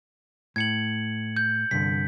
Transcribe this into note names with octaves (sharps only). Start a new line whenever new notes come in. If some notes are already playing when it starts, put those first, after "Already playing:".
A2 G#6 C#7 F#7
G6
C2 G2 D3 B6